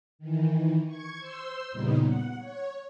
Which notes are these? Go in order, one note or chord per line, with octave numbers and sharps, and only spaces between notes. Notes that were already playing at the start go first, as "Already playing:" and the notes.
D#3 E3
C#6 G#6
C5 C6 E6
E2 A#2 C#3 G3 B3 D#4
F#5
C#5